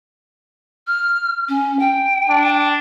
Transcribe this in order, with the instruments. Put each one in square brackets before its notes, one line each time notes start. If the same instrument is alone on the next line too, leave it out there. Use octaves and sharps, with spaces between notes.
[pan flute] F6
C#4
G5
[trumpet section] D4